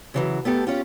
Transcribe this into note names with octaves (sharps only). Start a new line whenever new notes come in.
C#3 E3 F#3
A3 B3 G4 A4
C#4 F4 G4